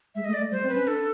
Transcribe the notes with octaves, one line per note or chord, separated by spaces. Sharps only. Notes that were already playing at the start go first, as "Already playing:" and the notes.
G#3 E5
A3 D#5
D5
A3
G3 C5
C4
B4
C#4
D4 A4